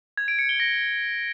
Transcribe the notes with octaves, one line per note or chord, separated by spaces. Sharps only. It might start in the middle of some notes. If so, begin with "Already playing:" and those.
G#6
D7
C#7
G7
A#6